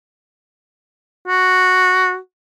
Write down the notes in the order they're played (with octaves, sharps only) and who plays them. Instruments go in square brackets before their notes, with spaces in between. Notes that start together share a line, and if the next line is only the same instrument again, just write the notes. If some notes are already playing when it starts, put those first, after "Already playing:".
[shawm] F#4